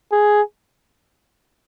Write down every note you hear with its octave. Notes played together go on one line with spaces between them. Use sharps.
G#4